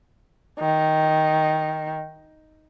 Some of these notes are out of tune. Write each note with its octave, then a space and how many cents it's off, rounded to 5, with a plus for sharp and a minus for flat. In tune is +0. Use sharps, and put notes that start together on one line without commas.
D#3 +5